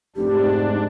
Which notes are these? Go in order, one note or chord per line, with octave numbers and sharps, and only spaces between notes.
F1 G#2 D4 G4